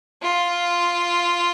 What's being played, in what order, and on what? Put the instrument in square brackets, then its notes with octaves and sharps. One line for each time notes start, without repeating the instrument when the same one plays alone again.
[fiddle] F4